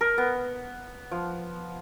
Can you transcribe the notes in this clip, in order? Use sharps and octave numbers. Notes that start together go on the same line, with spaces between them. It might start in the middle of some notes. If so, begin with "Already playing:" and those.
A#4
B3
F3